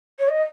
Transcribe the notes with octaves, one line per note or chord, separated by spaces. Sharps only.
C#5
D#5